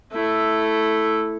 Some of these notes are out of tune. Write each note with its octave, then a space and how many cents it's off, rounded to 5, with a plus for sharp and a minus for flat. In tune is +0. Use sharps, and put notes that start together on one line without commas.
A3 +0 E4 +0